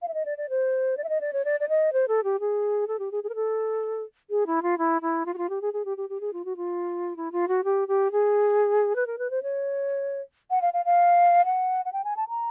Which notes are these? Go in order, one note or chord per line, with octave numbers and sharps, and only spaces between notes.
F5
E5
D#5
D5
D5
C5
D5
E5
D#5
D5
C#5
D5
D5
D#5
C5
A4
G4
G#4
A4
G4
G#4
G#4
A#4
A4
G#4
E4
F4
E4
E4
F4
F#4
F4
G4
G#4
G#4
G4
G4
G4
G#4
F4
F#4
F4
E4
F4
F#4
G4
G4
G#4
B4
A#4
B4
C5
C#5
F#5
F5
F5
F5
F#5
F#5
G5
G#5
A5
A#5